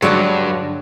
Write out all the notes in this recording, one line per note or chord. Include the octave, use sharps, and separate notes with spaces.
G2 D3 F#3 G#3 C#5 D5 F#6